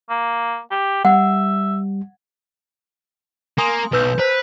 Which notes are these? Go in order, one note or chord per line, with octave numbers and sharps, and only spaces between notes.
A#3
G4
G3 E5 F#5
A#3 G#5 C6 D#6
B1 B4 E6 G6
B4 C5